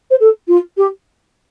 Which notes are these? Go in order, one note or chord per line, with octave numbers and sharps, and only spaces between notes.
C5
A4
F4
G4